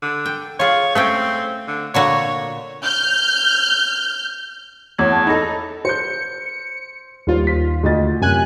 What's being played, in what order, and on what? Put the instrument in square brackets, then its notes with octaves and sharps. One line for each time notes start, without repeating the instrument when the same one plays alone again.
[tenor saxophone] D3
[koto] G5
[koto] F4 G#4 [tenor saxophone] C#5
[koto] A3 C#4 G5 [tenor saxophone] C4
[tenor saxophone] D3
[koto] A#2 D3 F#4 [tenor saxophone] C#5
[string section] F6 G6
[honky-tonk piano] E2 F#7 [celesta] C#5 G#6
[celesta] A5 G#6
[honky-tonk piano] D#4 A4 [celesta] B5 A#6
[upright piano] C5 G6 [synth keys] C#7
[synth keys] D#2 F4 [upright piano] G3 C5
[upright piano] B6
D2 D#5 A6
[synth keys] F#2 G#5 F#6 [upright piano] C3